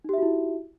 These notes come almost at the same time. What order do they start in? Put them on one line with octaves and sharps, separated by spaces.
D#4 G4 E5 F#4 E4